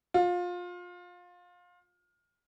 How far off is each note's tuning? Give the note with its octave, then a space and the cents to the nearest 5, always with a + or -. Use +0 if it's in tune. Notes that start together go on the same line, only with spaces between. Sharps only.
F4 +25